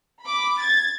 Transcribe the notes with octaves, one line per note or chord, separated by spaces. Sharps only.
B5 D6
G#6 A6